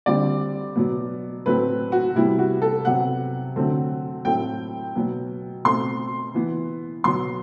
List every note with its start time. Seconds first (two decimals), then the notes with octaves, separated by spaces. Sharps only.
0.06 D3 G3 C4 D5
0.76 B2 F#3 B3
1.46 A2 F#3 A3 C4 B4
1.92 F#4
2.16 C3 G3 B3 E4
2.39 F#4
2.62 A4
2.85 C3 F#3 B3 F#5
3.56 D3 F#3 A3 C4
4.25 A2 F#3 A3 C4 G5
4.96 B2 F#3 B3
5.65 B2 A3 C4 C6
6.34 E3 B3
7.04 B2 F#3 B3 C6